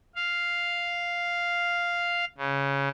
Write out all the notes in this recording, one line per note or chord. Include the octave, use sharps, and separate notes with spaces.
F5
C#3